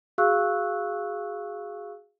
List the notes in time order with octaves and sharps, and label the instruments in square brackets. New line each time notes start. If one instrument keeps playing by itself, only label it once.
[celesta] F#4 G#4 F5 C#6 E6 F#6